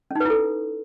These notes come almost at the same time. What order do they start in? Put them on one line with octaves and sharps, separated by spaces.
C#4 D#4 B4 E4 A4